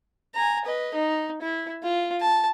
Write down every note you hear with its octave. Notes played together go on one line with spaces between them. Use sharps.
G#5 A#5
B4 D#5
D#4
E4
F4
A5